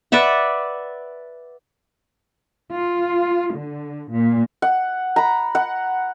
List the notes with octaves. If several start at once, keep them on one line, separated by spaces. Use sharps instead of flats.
B4 D5 E5 F#5
F4
D3
A#2
F#5
A#5 B5
F#5